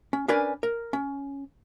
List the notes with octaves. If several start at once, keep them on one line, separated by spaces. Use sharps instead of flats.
C#4
C#4 D4 A#4 B4 D5 G#5
A#4
C#4